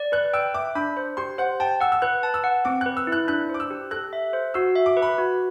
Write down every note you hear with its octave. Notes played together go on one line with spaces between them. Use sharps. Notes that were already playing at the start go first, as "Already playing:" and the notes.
Already playing: D5
B4 F#6
G5 E6
E5 D6
D4 B5
C5
G4 C6
C5 F#5
G5 A5
F#5 E6
E6
B4 F#6
A5
E6
F#5
C4 D6
B4 F#6
E6
E4
F#6
D4 F#6
C5 D6
E6
G4
A4 F#6
E5
C5
F#4 E6
E5
D6
B4
B5
F#4